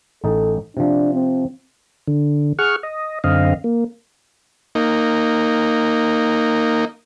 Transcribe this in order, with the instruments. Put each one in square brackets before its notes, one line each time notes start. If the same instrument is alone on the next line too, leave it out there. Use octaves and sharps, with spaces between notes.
[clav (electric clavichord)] A1 D#4 A5 [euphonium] A4
[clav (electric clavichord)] C3 F3 [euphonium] D4
[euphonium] C4
[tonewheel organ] D3
G#4 F#5 C#6 F6
D#5
F#2 D3 C4 D#5 F5
A#3
[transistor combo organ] A#3 D#4